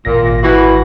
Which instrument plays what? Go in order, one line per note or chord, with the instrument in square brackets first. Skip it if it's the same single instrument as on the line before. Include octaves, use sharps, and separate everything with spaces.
[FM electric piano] G#1 A#6 [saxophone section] A#2
[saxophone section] E3 F#4